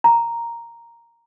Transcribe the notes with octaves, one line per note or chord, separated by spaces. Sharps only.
A#5